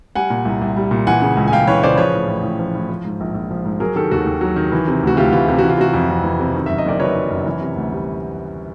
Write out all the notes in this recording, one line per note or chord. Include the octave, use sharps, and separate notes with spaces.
G3 F#5 G#5
A#2
C2
C2
G3
A#2
E3 F#5 G#5
C#3
C#2
G#5
C#2 F5 G5
E3 B4 C#5
C#3 C5 D5
F3 B4 C#5
A2
A1
A1
F3
A2
F3
G#2
A#1
A#1
F3
G#2
F#3 G#4 A#4
D#3 G4 A4
D#2 F#4
D#2
F#3
D#3
E3
C3
D2 F#4
D2 F4 G4
E3 F4
C3 G4
E3 F#4
F4
C3 F#4
F2
F2
E3
C3
D#3
F#2 E5
D#5
F#1 D5
F#3 B4 C#5
D#3
F#2
E3
C3
D2
G3